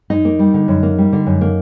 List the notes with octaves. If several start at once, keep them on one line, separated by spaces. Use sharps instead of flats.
F#2 D#4 D#5
A#3
G3
D3
F#2
A#3
G3
D3
F#2
A#3